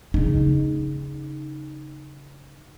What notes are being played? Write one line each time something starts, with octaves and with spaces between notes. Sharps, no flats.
C#3 D#4